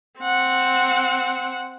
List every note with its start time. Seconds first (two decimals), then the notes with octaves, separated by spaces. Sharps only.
0.20 C4 F#5